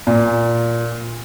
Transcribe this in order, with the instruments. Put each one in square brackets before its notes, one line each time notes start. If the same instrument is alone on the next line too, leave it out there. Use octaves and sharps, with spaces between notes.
[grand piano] A#2